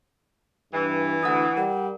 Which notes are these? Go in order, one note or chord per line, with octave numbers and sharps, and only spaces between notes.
G2 E3
D2 E4 F#5 D#6
G3 A#4 F#5